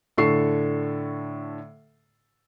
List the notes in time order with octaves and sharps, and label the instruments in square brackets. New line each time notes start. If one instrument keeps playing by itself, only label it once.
[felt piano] A2 D3 A4 C#6 C7